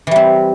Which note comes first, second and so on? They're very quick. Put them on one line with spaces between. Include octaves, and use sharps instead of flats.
E3 G3 C4